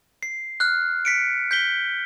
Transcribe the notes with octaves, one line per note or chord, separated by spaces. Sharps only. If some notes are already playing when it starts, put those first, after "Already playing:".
C7
F6 F#6
B6 C#7 D7
G6 B6 G7